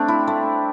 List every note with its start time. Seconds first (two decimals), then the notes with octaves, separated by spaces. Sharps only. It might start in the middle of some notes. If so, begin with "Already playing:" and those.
Already playing: A3 C4 D4
0.08 E4
0.27 A3